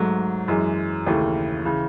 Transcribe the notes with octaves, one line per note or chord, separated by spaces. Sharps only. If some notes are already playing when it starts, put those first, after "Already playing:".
Already playing: G#2 F#3 A3
F#2 E3 G#3
D#2 C#3 E3 A3
C#3 E3